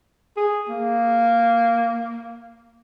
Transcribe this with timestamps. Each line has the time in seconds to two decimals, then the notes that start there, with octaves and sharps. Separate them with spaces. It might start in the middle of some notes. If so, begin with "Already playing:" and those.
0.37 G#4
0.69 A#3